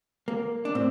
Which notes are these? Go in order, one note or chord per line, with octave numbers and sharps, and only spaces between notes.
A#3
D4
A2 C4